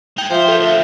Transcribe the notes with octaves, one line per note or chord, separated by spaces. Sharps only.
D#4 G#4 G5
F3 C5 E5
A4 C5 C#5
D2 E5